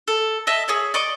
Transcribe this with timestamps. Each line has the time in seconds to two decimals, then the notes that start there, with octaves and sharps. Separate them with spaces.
0.08 A4
0.47 D#5 E5 A5
0.68 G#4 C#5 E5
0.94 D5 D#5 C#6 D6